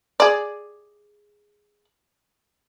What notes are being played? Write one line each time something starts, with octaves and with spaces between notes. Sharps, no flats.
G#4 D5